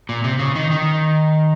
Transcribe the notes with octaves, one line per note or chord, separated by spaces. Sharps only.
A#2
C3
C#3
D#3
D#3